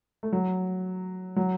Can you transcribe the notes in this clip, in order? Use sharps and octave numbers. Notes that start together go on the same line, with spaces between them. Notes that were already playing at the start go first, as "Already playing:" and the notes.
A3
F#3
F#3